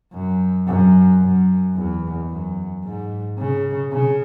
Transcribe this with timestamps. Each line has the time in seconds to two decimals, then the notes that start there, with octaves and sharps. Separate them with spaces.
0.13 F#2
0.67 F#2
1.21 F#2
1.76 E2
2.30 F#2
2.84 G#2
3.39 C#3
3.92 C#3